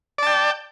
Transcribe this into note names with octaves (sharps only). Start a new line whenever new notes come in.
D5 G5 A5